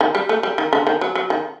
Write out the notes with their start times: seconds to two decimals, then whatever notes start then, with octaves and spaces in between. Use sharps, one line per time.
0.01 D#3
0.15 G3
0.29 A3
0.43 G3
0.58 D#3
0.73 D3
0.87 D#3
1.01 F#3
1.15 F#3
1.30 D#3